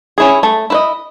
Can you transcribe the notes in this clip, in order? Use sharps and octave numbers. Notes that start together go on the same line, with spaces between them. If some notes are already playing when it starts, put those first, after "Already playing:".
C#4 E4 G#4
A3
E4 B4 D#5